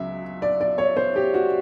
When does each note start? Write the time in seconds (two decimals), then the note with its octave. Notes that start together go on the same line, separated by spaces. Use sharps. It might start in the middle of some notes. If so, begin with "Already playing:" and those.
Already playing: C#2 F#3 E5
0.42 D5
0.61 D5
0.78 C#5
0.97 C5
1.16 G4
1.34 F#4